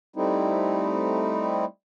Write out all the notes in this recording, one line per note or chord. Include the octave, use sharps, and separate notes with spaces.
G3 A3 C4 D#4 E4